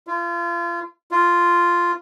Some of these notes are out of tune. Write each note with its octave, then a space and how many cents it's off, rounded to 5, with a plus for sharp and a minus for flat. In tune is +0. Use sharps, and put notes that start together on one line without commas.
F4 -30
F4 -5